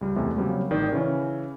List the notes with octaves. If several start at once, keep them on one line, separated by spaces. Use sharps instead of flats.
C#2 G3
E2 C3 G#3 A3
C#3 F#3 G3 A#3 C4
A1 D#3 D#4 D5
C#3 E3 C#4